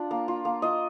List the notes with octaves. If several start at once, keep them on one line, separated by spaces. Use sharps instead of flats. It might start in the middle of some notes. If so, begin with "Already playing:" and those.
Already playing: D4 F4
A#3
F4
A#3
F4 D#5